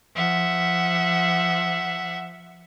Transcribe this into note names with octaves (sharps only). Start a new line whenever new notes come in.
F3 E5 F#5